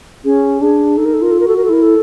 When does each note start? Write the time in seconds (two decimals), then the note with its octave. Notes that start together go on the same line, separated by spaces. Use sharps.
0.25 C#4 G#4
0.61 D4 G#4
0.97 D#4 A4
1.05 A#4
1.13 A4
1.22 F4 A#4
1.31 A4
1.40 A#4
1.46 F#4 A4
1.56 A#4
1.65 A4
1.69 E4 A#4
1.82 A4